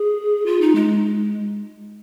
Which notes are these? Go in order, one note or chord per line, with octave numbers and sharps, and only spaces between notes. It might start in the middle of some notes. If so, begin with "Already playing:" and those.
Already playing: G#4
F4
D#4
G#3